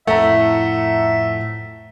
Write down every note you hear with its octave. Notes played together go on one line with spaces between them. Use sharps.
F2 A2 A3 E5 F#5 A#5